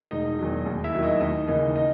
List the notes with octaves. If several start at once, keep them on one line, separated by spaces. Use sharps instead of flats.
E1 D#4 D#5
E2 D#3 F#3
D#2
E4 E5
D#3 F#3
D#4 D#5
D#2 D#4 D#5
C#3 E3 A#3 D#4 D#5
D#4 D#5